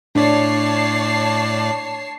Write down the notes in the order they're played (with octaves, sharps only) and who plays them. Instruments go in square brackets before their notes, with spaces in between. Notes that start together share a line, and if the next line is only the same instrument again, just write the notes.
[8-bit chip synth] A2 D5 [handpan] D4 [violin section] C#5 A5 C7